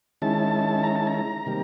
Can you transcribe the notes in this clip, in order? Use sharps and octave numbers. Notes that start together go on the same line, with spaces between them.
D#3 G#3 C#4 E4 A5
A#5
A5
A#5
C3 D#3 G3 A#3